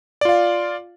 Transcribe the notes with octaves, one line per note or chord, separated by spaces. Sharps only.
F4 D5 F5